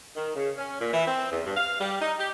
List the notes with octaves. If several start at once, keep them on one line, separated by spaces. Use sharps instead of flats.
D#3
C#3
C#4
A#2
E3
C4
E2
G2
F5
G3
D#4
G4